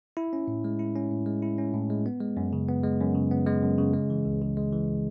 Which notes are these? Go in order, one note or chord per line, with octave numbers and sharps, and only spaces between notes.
E4
C#4
A2
G#3
E4
C#4
A2
G#3
E4
C#4
A2
G#3
B3
G#3
F#2
C#3
B3
G#3
F#2
C#3
B3
G#3
F#2
C#3
G#3
E3
C#2
C#3
G#3
E3